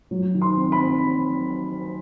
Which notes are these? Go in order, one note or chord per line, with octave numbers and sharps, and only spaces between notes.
F#3
D#3
C6
C4
B5
C4